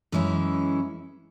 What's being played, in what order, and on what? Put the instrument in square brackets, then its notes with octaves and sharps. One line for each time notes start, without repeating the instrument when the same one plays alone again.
[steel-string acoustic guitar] F#2 E3 G#3 C#4 E4